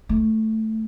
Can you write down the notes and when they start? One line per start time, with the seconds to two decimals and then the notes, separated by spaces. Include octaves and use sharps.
0.09 A3